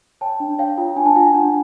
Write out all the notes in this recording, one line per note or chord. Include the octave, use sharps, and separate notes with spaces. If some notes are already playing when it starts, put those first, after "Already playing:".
C#5 G5 A5
D4
C#5 F5 G5
F4
D4 G#5
A5
F4 F#5 G#5
D4